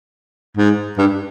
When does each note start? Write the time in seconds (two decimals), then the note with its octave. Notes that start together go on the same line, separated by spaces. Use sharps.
0.57 G#2
0.98 G2